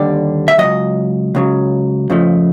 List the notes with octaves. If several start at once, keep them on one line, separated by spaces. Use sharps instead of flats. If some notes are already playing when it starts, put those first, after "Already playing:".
Already playing: D#2 D3 G3 D5
E5
C#2 C#3 F#3 D#5
C#2 C#3 F#3
F2 C#3 F3 A3